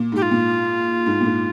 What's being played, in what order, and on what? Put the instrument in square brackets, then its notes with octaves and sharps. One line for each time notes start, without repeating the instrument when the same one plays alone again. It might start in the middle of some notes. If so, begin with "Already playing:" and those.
Already playing: [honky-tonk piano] A#2
[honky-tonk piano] G#2 [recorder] G4
[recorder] F4
[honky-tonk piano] A#2
G#2
A#2
G#2